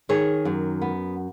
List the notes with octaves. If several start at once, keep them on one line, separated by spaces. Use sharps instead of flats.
D#3 G#4 C#5
F#2
B3